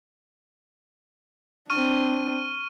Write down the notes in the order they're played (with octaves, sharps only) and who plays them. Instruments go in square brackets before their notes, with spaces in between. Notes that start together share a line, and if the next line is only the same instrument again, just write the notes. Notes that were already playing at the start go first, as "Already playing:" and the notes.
[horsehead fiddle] C4 D4 [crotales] C#6 F6 D#7